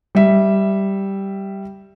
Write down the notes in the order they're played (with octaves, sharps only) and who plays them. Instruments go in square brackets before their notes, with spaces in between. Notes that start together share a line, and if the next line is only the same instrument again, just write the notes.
[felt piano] G3 E5